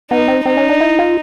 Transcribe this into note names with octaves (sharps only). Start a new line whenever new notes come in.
B3 D#4
C4
C4 D#4
C#4
D4
E4
F4